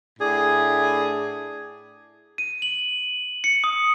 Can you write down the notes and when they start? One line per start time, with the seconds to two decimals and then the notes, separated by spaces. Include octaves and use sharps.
0.19 A2 D4 G#4
2.38 D#7
2.62 F#7
3.44 C#7
3.64 D#6